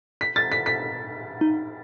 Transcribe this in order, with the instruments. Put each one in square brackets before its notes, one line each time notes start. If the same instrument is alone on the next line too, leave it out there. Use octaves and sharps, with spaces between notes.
[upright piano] B6
A6
B6
B6
[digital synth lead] D#4